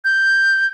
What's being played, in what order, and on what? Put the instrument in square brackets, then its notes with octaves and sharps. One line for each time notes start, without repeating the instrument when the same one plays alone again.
[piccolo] G6